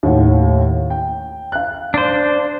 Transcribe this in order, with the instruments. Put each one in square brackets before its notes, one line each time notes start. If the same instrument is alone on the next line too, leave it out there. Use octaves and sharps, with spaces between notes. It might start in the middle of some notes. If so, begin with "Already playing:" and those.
[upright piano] D#2 A2 F#5
G5
F5 F#6
[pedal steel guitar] D4 C5